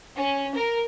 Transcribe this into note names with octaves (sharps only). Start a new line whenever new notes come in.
C#4
A#4